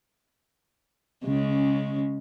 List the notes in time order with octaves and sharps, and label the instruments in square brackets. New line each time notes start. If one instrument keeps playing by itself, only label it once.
[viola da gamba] C#3 G#3 C#4